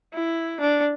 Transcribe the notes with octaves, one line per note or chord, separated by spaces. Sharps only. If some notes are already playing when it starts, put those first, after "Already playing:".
E4
D4